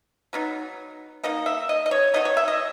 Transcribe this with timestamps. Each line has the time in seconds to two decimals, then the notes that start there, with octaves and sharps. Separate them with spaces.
0.33 F#3 B3 D#4
1.23 B2 A#3 D#4 D#5
1.46 E5
1.69 D#5
1.86 D#5
1.91 C#5
2.14 D#3 F#3 B3 D#4 D#5
2.25 C#5
2.37 E5
2.48 D#5